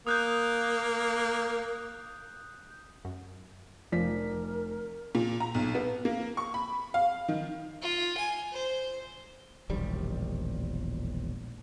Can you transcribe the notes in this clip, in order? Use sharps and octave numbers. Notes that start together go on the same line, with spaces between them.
A#3 D#6 F#6 G6
F#2
F1 F3 A#4 D5 B6
A#2
A#5
B1
B3
A#3
C#6
B5
F5
D#3
F4
G#5
C5
E1 A#1 D#2 G3